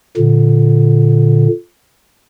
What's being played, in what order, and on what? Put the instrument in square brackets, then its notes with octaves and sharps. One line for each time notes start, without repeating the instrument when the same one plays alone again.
[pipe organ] A#2 D3